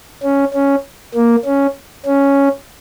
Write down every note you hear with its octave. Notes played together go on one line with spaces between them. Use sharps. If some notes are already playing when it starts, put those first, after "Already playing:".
C#4
C#4
A#3
C#4
C#4